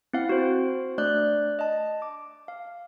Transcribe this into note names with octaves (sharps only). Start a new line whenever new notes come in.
C4 E4 F5 F#5
F#4 C5
A3 D4 D5 F#6 G6
D#5 A5
D6
F5